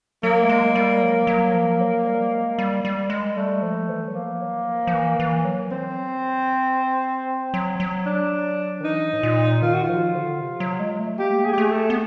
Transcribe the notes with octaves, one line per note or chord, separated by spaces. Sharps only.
F#3 A#3
A3
G#3
G3
F#3
F#3
F3
F#3
G3
G#3
G3
G3
G#3
G3 A3
F3
E3
F#3
F3 A#3
F#3
F3
F3
E3
E3
F#3
C4
F#3
F#3
D4
D#3
E3 D#4
A2
A#2
D#3 F4
F#4
F3 F4
D3
C3
F#3
G#3
A3
A#3 G4
G#4
G#3 G4
A3 G#4
A4
B3